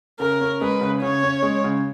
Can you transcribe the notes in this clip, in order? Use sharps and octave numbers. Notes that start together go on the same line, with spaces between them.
C#3 A#4
C#4
G#3 B4
C#3
C#3 C#5
C#4
G#3
C#3